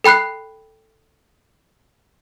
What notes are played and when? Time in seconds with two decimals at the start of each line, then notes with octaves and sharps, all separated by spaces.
0.04 A4 G5 B5 F#6 C7